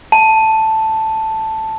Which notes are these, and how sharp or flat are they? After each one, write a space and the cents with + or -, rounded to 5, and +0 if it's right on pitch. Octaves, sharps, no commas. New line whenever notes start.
A5 +0